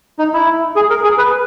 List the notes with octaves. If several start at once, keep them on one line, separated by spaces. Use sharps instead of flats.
D#4
E4
G#4
A#4
G#4
B4